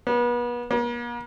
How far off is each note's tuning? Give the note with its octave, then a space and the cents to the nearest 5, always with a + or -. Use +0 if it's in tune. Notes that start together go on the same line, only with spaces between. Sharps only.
B3 -35
A#3 +45